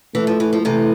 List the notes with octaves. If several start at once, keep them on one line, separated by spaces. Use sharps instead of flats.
E3 A3
F3
E3
F3
C3 E3 A3